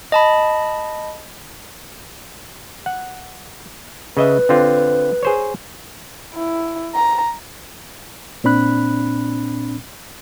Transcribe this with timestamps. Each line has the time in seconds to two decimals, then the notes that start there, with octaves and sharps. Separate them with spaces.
0.12 D#5 A5 B5
2.86 F#5
4.17 C#3 B4 D#5 E5
4.49 D3 C4 F4
5.23 G#4 C5 C#5
6.34 E4
6.95 A#5
8.44 A#2 C4 D4 B5 F#6